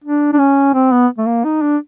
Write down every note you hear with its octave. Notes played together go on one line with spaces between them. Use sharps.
D4
D4
C#4
C4
B3
A3
A#3
D#4
D4